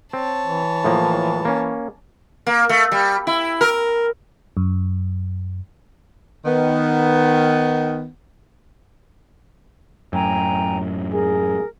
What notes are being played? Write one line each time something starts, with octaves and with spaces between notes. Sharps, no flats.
C4 C#5 A5
E3
A2 F3 A#3
A#3 C#4
A#3
A3
G3
E4
A#4
F#2
D#3 B3
F#2 A2 G5 G#5 A#5
G#4 A#4